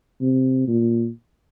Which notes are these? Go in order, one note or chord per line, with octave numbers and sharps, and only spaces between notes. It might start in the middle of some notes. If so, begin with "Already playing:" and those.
C3
A#2